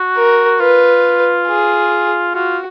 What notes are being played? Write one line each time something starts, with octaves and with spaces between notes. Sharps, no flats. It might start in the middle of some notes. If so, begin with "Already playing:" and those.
Already playing: F#4
A#4
F4 B4
G#4
F4 F#4